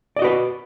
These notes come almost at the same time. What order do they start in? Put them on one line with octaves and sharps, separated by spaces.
D5 D#5 F#4 B4